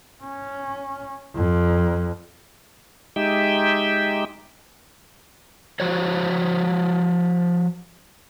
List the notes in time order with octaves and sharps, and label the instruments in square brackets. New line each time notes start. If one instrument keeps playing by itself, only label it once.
[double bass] C#4
F2
[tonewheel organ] G#3 D#4 G4 E5 G5
[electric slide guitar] F3 F#4 C5 C#5